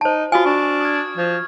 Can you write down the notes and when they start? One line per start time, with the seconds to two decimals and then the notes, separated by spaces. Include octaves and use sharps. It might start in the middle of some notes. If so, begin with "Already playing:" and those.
0.01 D#4 C5 A5
0.32 F4 F#4 G#5 D#6 F6
0.46 D4 C#6
0.81 D#6 F6 G#6
1.17 F3